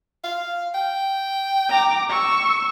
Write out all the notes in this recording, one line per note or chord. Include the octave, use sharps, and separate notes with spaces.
F5
G5
A#5 D6
C#6 E6